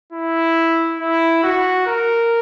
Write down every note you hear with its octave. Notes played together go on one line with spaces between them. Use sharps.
E4
E4
F#4
A#4